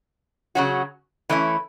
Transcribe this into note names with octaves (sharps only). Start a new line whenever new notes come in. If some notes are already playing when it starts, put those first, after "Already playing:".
C#3 F#3 C#4 F#4
E3 A3 C#4 E4